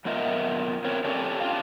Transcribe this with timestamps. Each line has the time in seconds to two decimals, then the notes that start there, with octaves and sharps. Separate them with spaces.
0.05 F#2 B3 F4 A#4 D#5 E5
0.85 C4 A#4 C#5
1.05 C4 C#4 G4 A4 C#5 D5
1.40 D4 F4 F5